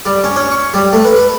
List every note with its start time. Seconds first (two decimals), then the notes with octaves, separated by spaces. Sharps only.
0.06 G3
0.24 C#4
0.36 C#4
0.52 C#6
0.74 G3
0.93 A3
1.05 B4
1.16 B4